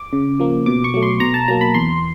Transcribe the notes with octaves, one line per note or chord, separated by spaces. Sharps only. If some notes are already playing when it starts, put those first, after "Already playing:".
Already playing: D6
C#3
F3 A#3
B2 D6
C#6
F#3 A3
C6
B2 A#5
A5
F#3 A#3 A#5
B5
E2 C6